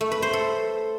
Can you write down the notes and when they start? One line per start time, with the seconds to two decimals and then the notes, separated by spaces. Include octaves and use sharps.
0.01 A3
0.12 B4
0.22 C5
0.33 A4